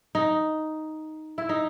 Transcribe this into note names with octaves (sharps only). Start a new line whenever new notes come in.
D#4
E4
D#4